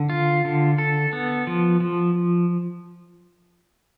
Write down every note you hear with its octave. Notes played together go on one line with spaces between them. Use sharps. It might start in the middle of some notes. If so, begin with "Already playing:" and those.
Already playing: D3
F4
D3
A4
B3
F3
F3